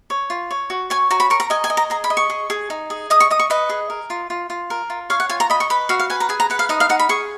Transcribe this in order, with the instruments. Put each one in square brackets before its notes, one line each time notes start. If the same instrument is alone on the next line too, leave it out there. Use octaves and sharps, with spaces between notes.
[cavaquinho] C#5
F4
C#5
F#4
C#5 G#5
F#4 A#5
B5
A#4 C#6
A#5
D#5 G#5
G#5
D#5
A#5
G#4 A#5
B5
D#5
C#6
G#4
G#4
D#4
G#4
D#5 D#6
C#6
D#5 D#6
C#6
B4 D#5
G#4
A#4
F4
F4
F4
A#4
F4
C#5 F5
F#5
F4 G#5
A#5
D#5 B5
C#6
B4 B5
F#4 F5
F5
B4 G#5
A#5
G#4 G#5
A#5
B4 F#5
F5
D#4 D#5
F5
D#4 F#5
B5
G#4 C#6